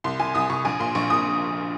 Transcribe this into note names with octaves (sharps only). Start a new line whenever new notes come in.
C2 C6
C2 G#5
C2 D#6
C2 C#6
A#1 G#5
A#2 C6
A#1 C#6
A#2 D#6